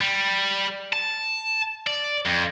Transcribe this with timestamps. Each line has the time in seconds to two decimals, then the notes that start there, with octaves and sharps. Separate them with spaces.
0.01 G3
0.93 A5
1.87 D5
2.26 F2